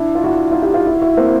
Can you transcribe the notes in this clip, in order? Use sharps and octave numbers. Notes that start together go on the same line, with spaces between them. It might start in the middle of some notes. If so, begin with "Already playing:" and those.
Already playing: D4 E4
F4
E4 F#4
D#4 F4
F4 G4
F4 G4
E4 F#4
E4 F#4
A#3 C4